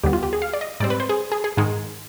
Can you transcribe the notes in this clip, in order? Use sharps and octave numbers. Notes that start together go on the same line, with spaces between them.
D#2 D3 G3 B3 G4
F4
G4
G#4
F5
D5
D#5
G#2 G3 C4 D5
B4
C5
G#4
G#4
G#4
G#2 D#3 G#3